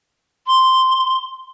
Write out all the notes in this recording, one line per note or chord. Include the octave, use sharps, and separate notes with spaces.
C6